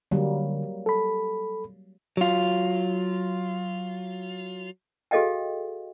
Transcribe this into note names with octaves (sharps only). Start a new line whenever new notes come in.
D3 F#3 G3 A#3
A4 B5
F#3 F4
F#4 G#4 A4 D#5 F5 G5